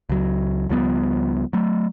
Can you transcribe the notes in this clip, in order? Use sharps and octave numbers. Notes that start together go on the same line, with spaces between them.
C#2 F#3
C#2 F3 G3 B3
F#3 A3